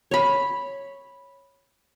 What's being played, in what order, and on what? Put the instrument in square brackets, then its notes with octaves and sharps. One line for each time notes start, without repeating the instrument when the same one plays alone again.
[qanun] C#5 B5